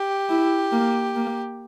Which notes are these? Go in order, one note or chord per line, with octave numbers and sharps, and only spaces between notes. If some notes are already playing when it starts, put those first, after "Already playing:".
Already playing: G4
E4
A#3
A#3